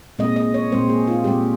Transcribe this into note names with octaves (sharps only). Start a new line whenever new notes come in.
A#2 G#3 C4 D#5
D#5
C#5
A#2 G#3 C4 C5
G#4
F4
A#2 G#3 C4 G4